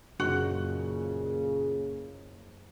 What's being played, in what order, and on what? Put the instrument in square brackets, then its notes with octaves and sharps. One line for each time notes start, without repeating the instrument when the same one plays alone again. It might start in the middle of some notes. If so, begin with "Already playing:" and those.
[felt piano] F#1 [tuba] A#2 [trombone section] C#3 [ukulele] F#4